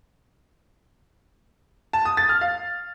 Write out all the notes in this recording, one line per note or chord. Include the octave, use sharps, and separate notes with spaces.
A5
D#6
A6
F6
F5